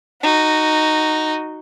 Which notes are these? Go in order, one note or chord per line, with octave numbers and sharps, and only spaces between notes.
D#4 F#4